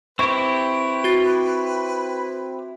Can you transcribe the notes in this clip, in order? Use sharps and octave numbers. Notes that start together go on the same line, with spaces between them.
C4 E4 G4 B4 C#6
F#4 A6